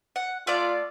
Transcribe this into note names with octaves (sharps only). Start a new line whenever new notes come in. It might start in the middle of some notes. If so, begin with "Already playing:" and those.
F#5
A3 F4 D5 D6